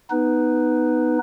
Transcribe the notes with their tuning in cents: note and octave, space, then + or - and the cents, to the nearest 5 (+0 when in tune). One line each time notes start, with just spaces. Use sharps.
B3 +0 D#4 +0 B4 +0